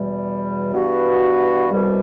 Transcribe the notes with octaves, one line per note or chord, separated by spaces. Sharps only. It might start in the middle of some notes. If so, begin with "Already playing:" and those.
Already playing: E2 B2 G3
G2 E3 B3 F#4
C2 B2 G3